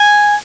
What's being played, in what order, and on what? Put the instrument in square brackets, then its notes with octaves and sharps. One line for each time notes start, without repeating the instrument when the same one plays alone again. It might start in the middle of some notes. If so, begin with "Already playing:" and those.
Already playing: [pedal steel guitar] G#5